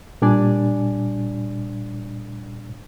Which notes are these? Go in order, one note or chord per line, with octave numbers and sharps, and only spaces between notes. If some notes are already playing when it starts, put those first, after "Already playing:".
A#2 G3 D4 D5 G#5